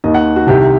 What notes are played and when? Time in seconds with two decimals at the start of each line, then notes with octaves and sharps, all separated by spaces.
0.04 D#2 D#3 D#5
0.14 F#5
0.36 F#4
0.47 C2 C3 D#3 G4